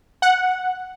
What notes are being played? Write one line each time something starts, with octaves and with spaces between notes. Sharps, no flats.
F#5